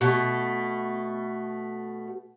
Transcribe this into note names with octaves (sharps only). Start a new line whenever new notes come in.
B2 A3